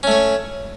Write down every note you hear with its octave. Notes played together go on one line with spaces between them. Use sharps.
A3 C#4 C#5